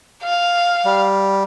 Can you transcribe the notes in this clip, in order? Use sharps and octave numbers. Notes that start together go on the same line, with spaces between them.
F5
G3